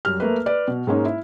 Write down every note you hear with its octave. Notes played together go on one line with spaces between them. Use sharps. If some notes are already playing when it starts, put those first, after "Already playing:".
F#2 G3 F6
A3 A#3 B4
B4 D5
B2
G#2 G#3 A#3 C#4 D#4
E4